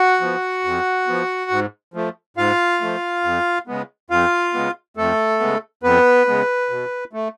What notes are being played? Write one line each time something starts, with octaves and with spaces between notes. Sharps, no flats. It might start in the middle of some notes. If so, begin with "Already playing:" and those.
Already playing: F#4 F#5
F3 B3
F2
F3 B3
G#2
F3 A3
G#2 F4 F5
F3 A3
F2
C#3 G#3 B3
F2 F4 F5
C#3 G#3 B3
F2 A3 A4
C#3 G#3 B3
F2 B3 B4
C#3 G#3 B3
B2
A3